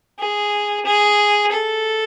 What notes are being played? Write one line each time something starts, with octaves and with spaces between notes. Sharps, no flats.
G#4
G#4
A4